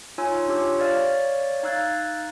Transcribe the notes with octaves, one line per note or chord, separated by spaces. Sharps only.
D#4 F4 C#5 G#5 E6
D4 F4 G4 C#5 E6
C#5 D5 F5 F6
D#4 F5 E6 F#6 G#6 A6